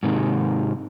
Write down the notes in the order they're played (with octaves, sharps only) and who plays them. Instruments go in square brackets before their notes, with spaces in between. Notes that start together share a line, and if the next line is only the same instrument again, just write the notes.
[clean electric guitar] G#2 C3 D#3